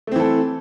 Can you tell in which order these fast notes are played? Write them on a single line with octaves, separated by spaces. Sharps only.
A3 C4 E3 A4